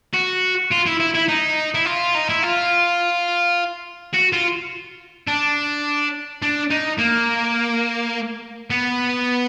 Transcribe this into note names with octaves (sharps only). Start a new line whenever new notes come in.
F#4
F4
E4
E4
E4
D#4
E4
F4
D#4
E4
F4
F#4
F4
D4
D4
D#4
A#3
B3